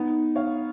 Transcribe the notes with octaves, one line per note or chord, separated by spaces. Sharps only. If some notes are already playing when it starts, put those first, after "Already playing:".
Already playing: B3 D#4
C#5 F5